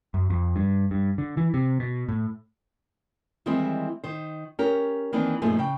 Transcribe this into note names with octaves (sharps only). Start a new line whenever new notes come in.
F#2
F2
G2
G2
D3
E3
C3
B2
A2
D#3 E3 G3 G#3 C4 E4
D#3 C5
C#4 G4 A#4
D#3 E3 A#3 C4 D4
F#2 A#2 F3 A3 D#4 G#4
C#3 G5